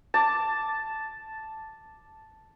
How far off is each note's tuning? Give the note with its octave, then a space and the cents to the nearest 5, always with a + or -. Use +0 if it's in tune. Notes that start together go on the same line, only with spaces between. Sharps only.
A5 +0 D6 +0